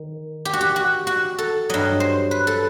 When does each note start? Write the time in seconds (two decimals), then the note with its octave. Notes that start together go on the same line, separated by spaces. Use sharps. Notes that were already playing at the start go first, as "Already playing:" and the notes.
Already playing: D#3
0.45 G4
0.53 F#4
0.61 G4
0.76 F#4
1.07 F#4
1.38 A4
1.69 G2 F#3 D#5
2.00 C5
2.31 B4
2.47 A4